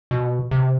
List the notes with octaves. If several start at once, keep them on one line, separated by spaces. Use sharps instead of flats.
B2
C3